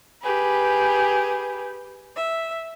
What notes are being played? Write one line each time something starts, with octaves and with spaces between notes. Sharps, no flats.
G4 G#4 B4
E5